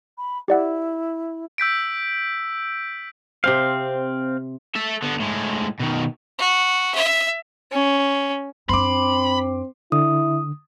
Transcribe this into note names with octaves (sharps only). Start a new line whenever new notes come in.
B5
E4 G4 D5 F#5
E6 G6 B6 D7
C3 C4 C5 F5
A4 E5
D3 B3
A2 G#3
B2 D#3
F#4
E5
C#4
F#2 C4 D4 B5 C6 D6
D3 E4 D#6